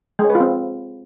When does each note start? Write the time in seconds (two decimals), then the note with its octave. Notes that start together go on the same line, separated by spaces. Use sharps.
0.19 G#3
0.24 C#5
0.30 B4
0.35 F4
0.40 C4